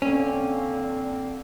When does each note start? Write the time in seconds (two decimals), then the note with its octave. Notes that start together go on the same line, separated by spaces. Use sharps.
0.02 D3 A#3 C4 C#4